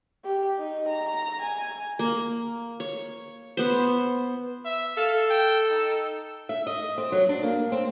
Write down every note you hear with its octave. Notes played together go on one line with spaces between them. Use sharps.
G4
D#4
A#5
G#5
A#3
C#5
B3 C5
E5
A4 F5
G5
D#4
E5
D#5
C4
F#3
D4
A#3
C4